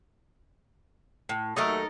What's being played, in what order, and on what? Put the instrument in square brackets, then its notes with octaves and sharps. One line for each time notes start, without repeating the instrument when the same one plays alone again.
[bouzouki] A2
[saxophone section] D#2 F#3 A3 [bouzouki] D#4 A4 A#4